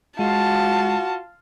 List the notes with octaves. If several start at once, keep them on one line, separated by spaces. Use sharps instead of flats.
G#3 F4 F#4 A5